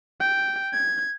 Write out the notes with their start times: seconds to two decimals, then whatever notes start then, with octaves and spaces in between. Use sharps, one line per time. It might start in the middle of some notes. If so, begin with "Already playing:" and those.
0.21 G5
0.73 G#6